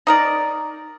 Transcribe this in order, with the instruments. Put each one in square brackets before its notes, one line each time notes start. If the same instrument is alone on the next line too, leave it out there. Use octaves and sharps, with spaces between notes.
[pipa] D#4 A#4 D5